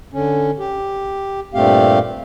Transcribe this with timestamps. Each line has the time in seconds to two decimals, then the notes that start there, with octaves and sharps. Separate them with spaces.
0.13 D3 C#4
0.59 G4
1.54 G2 A#2 A3 C4 G4 F5